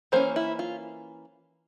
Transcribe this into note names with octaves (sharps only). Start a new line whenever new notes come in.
E3 A#3 C#4 C5
E4
F4